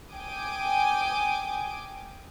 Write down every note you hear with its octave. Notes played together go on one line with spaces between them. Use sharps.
G5 G#5 D6 D#6